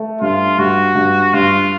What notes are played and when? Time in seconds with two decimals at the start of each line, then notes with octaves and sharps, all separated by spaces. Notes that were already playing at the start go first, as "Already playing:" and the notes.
Already playing: A3
0.21 G2 F4
0.58 G2 F#4
0.95 G2
1.34 G2 F4